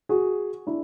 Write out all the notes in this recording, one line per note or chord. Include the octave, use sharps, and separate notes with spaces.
F#4 G#4
D4 E4